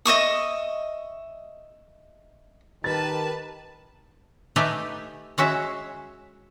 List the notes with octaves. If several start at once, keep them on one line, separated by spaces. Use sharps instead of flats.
D#5 E5 C#6 D#6
D#3 G4 A#4 B4 A5 A6
A3 D#4 G4 B4 E5 G#5
G#3 C#4 F#4 E5